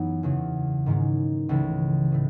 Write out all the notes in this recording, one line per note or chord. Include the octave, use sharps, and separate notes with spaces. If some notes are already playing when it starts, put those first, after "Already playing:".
Already playing: F#2 E3 B3 D#4
E2 C#3 F#3
G#2 D#3 G#3 C#4
C#2 C#3 E3 A3
A2 E3 A3